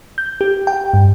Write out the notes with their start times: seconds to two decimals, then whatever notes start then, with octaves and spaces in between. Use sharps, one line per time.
0.18 G6
0.41 G4
0.67 G5
0.94 G2